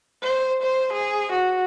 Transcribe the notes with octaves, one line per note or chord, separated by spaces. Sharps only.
C5
C5
G#4
F#4